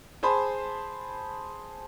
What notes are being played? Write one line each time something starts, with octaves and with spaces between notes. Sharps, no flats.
G#4 C5 A5 B5 C6